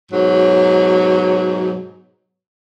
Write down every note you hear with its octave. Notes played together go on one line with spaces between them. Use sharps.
G#2 B2 F#3